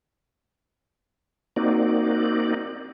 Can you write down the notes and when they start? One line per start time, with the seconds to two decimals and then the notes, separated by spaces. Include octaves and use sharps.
1.56 A#3 C4 D#4 F#4 D5